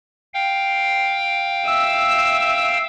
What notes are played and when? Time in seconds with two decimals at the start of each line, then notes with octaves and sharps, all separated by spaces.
0.34 F5 G5
1.66 E5 E6